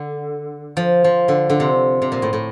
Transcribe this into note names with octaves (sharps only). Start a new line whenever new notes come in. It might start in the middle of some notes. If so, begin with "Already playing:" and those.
Already playing: D3
F3
F3
D3
D3
C3
C3
A#2
A2
A2